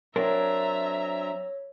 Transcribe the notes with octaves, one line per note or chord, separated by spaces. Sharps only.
F#3 C4 D4 A#4 C#5 E5 A#5 A#6